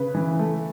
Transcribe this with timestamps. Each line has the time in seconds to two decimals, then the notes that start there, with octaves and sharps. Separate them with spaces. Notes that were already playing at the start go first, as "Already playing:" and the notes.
Already playing: C#3 B4
0.15 E3
0.39 A3